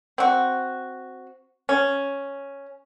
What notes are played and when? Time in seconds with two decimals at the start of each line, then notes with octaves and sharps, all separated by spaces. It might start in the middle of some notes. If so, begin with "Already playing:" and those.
0.18 C4 F#4
1.69 C#4